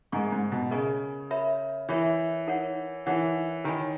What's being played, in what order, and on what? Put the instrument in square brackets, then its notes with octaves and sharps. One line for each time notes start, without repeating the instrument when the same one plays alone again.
[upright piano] G#2 [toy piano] A#4 D#5 G#5 C#6
[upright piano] G#2
B2
[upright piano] C#3 [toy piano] A#4 D#5 G#5 C#6
[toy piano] A#4 C#5 E5 B5
[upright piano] E3 [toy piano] A#4 C#5 E5 B5
[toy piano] D#4 A#4 C#5 F#5
[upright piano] E3 [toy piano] D#4 A#4 C#5 F#5
[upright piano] D#3 [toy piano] A#4 C#5 G#5 B5